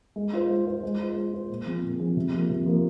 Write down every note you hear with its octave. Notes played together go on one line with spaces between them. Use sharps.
G#3
F4 C5
G#3
F4 C5
G#3
F4 C5
G#3
F4 C5
A#2
F3 C4 G#4
A#2
F3 C4 G#4
C3
F3 A#3
C3
F3 A#3